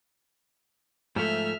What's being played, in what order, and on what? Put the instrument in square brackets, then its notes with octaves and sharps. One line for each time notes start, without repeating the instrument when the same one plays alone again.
[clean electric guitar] G#2 F3 A3 [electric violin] E5 F6